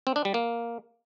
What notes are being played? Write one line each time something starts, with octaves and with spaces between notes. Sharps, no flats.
C4
D4
G3
A#3